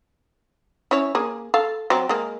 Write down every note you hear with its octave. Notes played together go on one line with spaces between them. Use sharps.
C#4 E4 C#5
A#3 G#4
A4 F5
F#3 C4
G#3 A#3